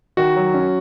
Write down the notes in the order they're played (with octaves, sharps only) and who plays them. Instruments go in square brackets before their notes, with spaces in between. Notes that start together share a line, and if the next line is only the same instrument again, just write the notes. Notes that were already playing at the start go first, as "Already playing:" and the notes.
[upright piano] D#3 [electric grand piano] F#4
[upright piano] F#3
C#4